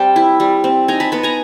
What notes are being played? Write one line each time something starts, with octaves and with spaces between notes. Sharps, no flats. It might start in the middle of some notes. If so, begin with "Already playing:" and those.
Already playing: G3 C4 G5 A5
E4
G3
C4
D#4 G#5 A#5
A5 B5
B3 B5
G#5 A#5